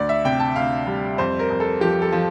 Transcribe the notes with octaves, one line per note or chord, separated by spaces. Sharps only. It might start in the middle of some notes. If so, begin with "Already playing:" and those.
Already playing: D2 D5
E5
C3 G5
A5
D2 F5
G3
F2 C5
A#4
F2
A4
F3 G4
A4
F3